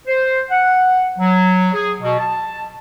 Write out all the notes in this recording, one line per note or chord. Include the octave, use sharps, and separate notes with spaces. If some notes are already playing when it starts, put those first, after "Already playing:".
C5
F#5
F#3
G#4
B2
A5